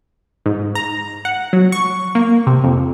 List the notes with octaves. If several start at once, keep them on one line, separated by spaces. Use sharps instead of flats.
G#2
A#5
F#5
F#3
C#6
A#3
C3
F2